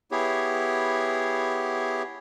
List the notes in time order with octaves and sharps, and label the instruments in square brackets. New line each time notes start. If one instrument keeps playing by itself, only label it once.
[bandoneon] B3 E4 G4 G#4 C#5